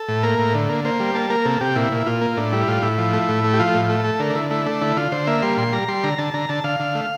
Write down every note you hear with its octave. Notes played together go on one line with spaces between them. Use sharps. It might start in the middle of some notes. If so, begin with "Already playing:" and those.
Already playing: A4
A2
A#3 A#4
A2
D3
A#3
A#3 C5
G3
A#3 A5
A#3 A#4
C3 A4
C3 G4
A#2 E4
A#2
A#2 F4
A#3
A2 D4
G3 E4
A2 F4
A2 E4
F3
A3
A2
A3
G4
F3 F4
A2
A3
A3 A4
D3 A#4
D4
D3 E4
A3 E4
A3 D4
D3 E4
D3 F4
D3 C5
A#3 E5
G3 C6
A#2 C6
G3 A#5
G3 C6
D3 A#5
D3 A5
D3 A#5
D3 A5
D3 F5
D3
A3